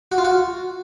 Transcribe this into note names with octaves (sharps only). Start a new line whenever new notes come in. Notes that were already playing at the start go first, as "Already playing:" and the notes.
F#4
F4
F#4